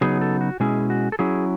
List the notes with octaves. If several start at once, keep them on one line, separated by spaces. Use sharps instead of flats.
C#3 F#3 B3 D#4 G#4
A4
F#4
B2 G#3 C#4 E4 G#4
F#4
A4
F#3 C#4 E4 G#4